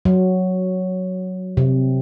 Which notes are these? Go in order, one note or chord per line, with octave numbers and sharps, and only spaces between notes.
F#3
C3